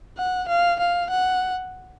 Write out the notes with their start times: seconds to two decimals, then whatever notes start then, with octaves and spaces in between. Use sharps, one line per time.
0.18 F#5
0.49 F5
0.80 F5
1.11 F#5